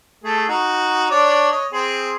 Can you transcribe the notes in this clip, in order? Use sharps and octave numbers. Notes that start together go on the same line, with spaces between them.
A3 G#4 A4
D#4 F#4
D4 C#5 D5
C#5 D#5
C4 G#4